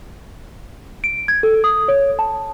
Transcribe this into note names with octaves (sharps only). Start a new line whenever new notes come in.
D7
G#6
A4
D#6
C#5
A5